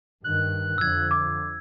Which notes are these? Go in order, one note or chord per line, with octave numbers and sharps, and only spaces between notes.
G2 D#3 F#6
F2 D3 F3 E6 G#6
D6